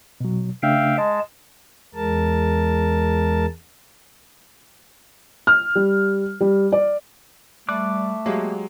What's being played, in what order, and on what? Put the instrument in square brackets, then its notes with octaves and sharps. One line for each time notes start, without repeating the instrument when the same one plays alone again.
[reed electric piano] B2 F#3
[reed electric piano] C#3 A3 D4 [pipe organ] E5 F5 G5
[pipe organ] G#3 A5 [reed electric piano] D#5
[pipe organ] E2 G#3 A#4 A5
[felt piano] F6
G3
G3
D5
[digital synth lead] G3 [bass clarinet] A3 [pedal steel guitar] D6 F#6
[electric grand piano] F#3 G#3 G4 [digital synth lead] A#3